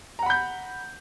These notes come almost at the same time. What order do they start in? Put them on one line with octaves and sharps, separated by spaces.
A#5 F#5 B5 G6